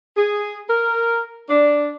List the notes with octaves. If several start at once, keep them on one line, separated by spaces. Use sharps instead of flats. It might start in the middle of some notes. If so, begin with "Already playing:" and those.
G#4
A#4
D4